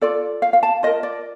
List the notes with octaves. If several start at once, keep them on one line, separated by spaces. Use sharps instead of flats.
F4 A4 D5
F5
F5
A5
F4 A#4 D#5
D5